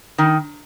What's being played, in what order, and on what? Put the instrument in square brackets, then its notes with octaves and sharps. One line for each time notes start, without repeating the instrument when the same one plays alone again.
[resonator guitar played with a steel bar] D#3